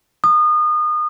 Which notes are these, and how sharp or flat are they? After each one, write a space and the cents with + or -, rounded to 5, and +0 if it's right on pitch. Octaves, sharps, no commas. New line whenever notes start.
D#6 -30